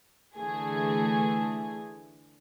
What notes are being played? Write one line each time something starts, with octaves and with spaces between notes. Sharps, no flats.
D3 E3 A3 G#4